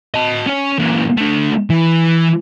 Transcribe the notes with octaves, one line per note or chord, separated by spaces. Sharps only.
D#5 A5
C#4 C#5
A#2 E3
D3 A3
E3